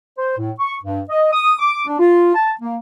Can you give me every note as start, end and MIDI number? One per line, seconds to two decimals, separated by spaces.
0.18 0.35 72
0.37 0.51 45
0.60 0.76 85
0.84 1.01 43
1.09 1.32 75
1.32 1.55 87
1.59 1.84 86
1.87 1.97 62
1.99 2.33 65
2.35 2.52 81
2.61 2.76 58